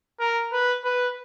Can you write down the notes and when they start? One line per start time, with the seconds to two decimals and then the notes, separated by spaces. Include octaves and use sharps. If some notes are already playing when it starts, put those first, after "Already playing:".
0.20 A#4
0.52 B4
0.85 B4